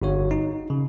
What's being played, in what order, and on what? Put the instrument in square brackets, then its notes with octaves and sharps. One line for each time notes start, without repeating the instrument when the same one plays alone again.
[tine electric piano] G1 G2 F#4 C#5
D#4
C#3